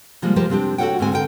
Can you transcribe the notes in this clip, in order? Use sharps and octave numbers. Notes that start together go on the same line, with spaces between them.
C3 F3 G3 G#3 A#3
F3 G3 G#3 G4 A#4 C5
C3 C4 D4 G4
F#4 A4 A#4 C#5 F#5 G5
D2 G#2 G#3 C4 G#5
D3 A#4 G5